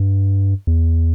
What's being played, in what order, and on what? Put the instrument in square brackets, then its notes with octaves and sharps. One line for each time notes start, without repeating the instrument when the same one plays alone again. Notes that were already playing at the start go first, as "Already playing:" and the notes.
Already playing: [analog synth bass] G2
E2